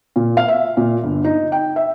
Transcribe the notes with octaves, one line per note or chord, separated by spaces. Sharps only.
A#2
F5
E5
A#2
G1
D#4
G5
E5